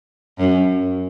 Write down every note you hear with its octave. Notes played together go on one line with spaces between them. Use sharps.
F#2